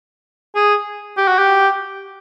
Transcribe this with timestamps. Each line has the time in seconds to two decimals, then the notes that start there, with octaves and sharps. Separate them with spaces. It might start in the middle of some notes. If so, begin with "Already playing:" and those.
0.56 G#4
1.18 G4
1.28 F#4
1.38 G4